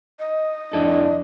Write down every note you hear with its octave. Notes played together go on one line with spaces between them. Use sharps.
D#5
F2 D4 E4 A4